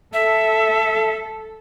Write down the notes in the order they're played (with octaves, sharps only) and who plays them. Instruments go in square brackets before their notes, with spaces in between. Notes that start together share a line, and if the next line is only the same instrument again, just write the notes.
[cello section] A4 [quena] E5